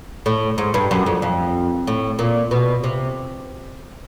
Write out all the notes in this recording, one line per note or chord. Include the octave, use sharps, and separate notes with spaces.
A2
G#2
G2
F#2
F2
F2
A2
A#2
B2
C3